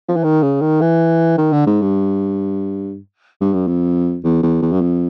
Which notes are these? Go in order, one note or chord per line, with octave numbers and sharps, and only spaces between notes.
F3
E3
D#3
C#3
D#3
E3
D#3
D3
G#2
G2
G2
F#2
F2
E2
E2
E2
F#2
F2